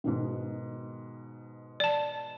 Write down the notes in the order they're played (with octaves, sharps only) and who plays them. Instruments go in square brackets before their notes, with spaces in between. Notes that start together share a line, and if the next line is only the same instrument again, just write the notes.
[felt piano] G#2 B2 D#3
[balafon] D5 A5